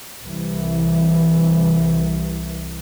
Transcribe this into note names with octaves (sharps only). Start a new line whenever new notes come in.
C2 E3